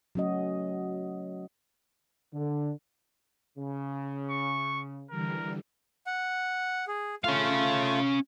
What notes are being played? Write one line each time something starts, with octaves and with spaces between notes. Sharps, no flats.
F#3 A3 C#4 F#4 D#5
D3
C#3
C#6
D3 E3 G3 A#4
F#5
G#4
A3 C#4 F4 F5